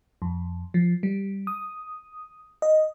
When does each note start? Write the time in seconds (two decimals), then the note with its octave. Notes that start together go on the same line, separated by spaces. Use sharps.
0.22 F2
0.74 F3
1.03 G3
1.47 D#6
2.62 D#5